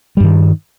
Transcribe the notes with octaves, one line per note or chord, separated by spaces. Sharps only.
G2 D#3 G3